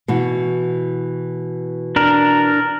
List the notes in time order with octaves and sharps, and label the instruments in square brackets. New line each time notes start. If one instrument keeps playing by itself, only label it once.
[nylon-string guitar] B2 E3 F#4
[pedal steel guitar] D4 A#4